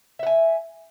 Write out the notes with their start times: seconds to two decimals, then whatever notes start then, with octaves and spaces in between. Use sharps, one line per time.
0.19 E5
0.23 F#5
0.26 G#5